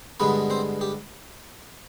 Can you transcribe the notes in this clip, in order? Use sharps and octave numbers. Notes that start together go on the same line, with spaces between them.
G2 D3 G#3 B3 B4
C4 C5
G4